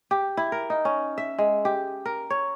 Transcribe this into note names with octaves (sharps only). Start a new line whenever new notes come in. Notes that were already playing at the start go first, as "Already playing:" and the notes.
G4
E4
A#4
D#4
C#4
E5
G#3
G4
A#4
C#5